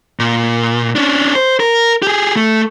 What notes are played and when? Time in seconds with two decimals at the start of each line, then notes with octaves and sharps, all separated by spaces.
0.19 A#2
0.96 C#4 D4
1.35 C5
1.60 A#4
2.02 G4 G#4
2.36 A3